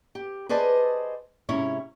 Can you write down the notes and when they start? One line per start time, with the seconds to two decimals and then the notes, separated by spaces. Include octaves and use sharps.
0.15 G4
0.49 G#4 B4 C5 D5 D#5 A5
1.49 G#2 C3 C#4 E4 C#5